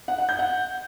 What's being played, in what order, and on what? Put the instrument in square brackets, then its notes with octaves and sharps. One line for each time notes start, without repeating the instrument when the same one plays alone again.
[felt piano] F#5
F#5
G6
F#5